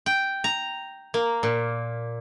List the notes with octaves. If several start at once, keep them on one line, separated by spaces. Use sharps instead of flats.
G5
A#5
A#3
A#2